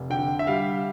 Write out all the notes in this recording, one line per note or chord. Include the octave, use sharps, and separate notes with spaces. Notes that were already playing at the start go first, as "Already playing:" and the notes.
Already playing: F1
D3 G5
E5
G3 F5